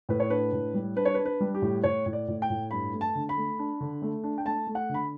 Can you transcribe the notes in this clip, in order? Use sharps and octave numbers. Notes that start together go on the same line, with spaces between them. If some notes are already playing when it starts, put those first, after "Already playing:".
A2 B4
C#5
D4 B4
A2
G3
D4 B4
C#5
B4
D4
B4
G3
G4
A2
A2 C#5
A2
D5
A2
G5
A2
G2 B5
A3
A5
D3
B5
A3
D4
D3
A3
D4
G5
A3 A5
A3
F#5
D3 B5